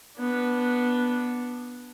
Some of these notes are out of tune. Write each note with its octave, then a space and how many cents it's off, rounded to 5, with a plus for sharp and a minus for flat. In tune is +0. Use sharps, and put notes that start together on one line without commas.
B3 -10 D4 +0